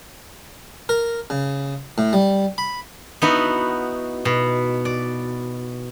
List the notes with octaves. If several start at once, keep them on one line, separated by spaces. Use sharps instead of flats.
A#4
C#3
A2
G3
B5
B3 D#4 E4 F#4
B2
D5